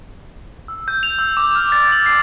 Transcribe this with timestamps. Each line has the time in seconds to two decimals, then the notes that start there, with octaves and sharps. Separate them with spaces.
0.68 E6
0.88 G6
1.03 F7
1.19 E6
1.37 D6
1.55 F6
1.72 A6
1.92 F#7
2.06 C7